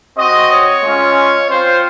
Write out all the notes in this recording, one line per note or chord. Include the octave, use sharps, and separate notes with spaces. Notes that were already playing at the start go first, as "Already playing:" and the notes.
C4 F#4 D#5
C#5
G#3 C#4 F4
C4 F4 C5